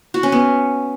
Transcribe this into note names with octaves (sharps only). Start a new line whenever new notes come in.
F#4
C#4
B3